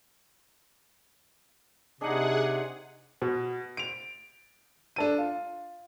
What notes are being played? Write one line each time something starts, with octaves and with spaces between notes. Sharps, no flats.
C3 D4 D#4 G#4 D#5 F#5
B2
D7 F7
D4 A4 D#7
F4